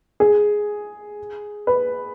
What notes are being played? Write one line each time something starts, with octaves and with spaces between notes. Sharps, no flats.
G#4
B4